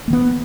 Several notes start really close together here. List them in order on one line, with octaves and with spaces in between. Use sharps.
A#3 D#3 B3